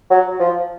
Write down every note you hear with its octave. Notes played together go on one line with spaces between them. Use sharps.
F#3
F3